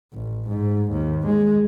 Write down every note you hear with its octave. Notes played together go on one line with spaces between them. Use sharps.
A1
G#2
D#2
G#3